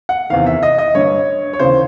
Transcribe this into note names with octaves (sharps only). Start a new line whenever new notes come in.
F#5
E2 C3 D#3 F5
E5
D#5
D#5
G2 D3 C#5
C#5
D#2 C#3 E3 C5